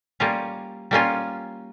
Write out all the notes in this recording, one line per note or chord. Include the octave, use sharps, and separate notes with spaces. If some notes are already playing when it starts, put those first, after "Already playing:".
G3 A#3 C#4 F4
G3 A#3 C#4 F4